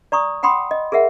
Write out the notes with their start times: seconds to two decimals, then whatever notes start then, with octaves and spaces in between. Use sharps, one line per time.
0.12 D5 A#5 C#6 D#6
0.43 F#5 G5 B5 C6 D#6
0.71 D#5
0.92 G#4 A#4 E5 F#5